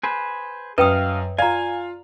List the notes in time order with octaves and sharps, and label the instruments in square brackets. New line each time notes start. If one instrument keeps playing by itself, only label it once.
[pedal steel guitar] G#4 B4 C5
[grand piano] F#2 [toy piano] B4 G5 D#6 [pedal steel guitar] D#5 F5
[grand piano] F4 F5 [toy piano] D5 A#5 [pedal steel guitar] G#5